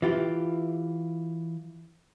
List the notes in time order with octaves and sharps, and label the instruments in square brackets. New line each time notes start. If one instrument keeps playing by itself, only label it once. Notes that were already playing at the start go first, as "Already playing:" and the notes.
[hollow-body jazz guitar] E3 F4 G4